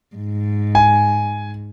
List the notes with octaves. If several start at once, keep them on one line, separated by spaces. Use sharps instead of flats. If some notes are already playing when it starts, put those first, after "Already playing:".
G#2
G#5